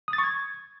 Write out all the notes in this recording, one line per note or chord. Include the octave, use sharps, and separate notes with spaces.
D#6
A6
C#6
G#6